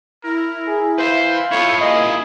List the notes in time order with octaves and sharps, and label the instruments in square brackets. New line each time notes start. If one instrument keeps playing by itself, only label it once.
[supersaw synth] E4 [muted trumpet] A#4
[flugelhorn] G#4
[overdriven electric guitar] B4 E5 [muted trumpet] C5 [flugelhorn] F5
[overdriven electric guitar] E4 F4 [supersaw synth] A4 D#6 G6 [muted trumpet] C#5
[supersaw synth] A#3 [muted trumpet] G#4 [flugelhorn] D#5